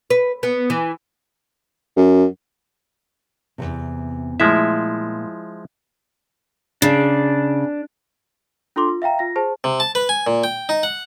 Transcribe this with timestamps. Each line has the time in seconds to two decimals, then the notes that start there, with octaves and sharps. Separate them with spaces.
0.10 B4
0.43 B3
0.70 E3
1.96 F#2
3.58 E2 A2 C3
4.40 A#2 F3 G#3 A3 E4 E5
6.82 C#3 D4
8.76 D4 F4 A4 C6 D6
8.89 F4
9.02 E5 F5 G5 A#5
9.19 F4 A#6
9.36 G#4 C5 A5
9.64 C3
9.80 A5
9.95 B4
10.09 G#5
10.27 A#2
10.44 G5
10.69 D#4
10.83 F#5